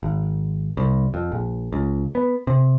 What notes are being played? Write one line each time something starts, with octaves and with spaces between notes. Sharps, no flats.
G#1
C2
F2
A#1
C#2
B3
C3